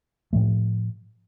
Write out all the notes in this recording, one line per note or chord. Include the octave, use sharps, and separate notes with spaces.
A2 F3 A3